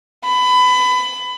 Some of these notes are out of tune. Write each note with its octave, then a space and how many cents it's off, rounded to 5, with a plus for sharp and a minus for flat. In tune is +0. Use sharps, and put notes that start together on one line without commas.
B5 +25